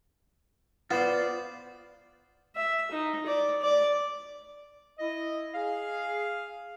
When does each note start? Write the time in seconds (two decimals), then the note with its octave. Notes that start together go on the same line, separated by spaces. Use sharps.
0.91 B3 F4 C5 D5
2.56 E5
2.92 D#4
3.26 D5
3.62 D5
4.99 E4 D#5
5.54 G#4 F5